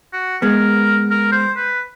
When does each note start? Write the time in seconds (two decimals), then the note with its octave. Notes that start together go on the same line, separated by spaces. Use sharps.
0.13 F#4
0.42 G#3 B3 A#4
1.11 A#4
1.32 C5
1.57 B4